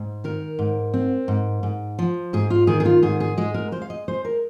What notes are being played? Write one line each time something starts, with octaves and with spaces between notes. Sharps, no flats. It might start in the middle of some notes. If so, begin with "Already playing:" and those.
Already playing: G#2
D#3 A#4
G#2
C4
G#2
G#2
F3
G#2 G#4
F4
D#3 G#4
G#4
F4
G#2 G#4
G#4
G#3 G#4
A#4
G#3 C5
F5
D#5
G#3 C5
A#4